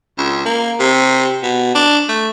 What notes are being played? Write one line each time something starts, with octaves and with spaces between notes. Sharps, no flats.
C#2
A#3
C3
B2
D4
A3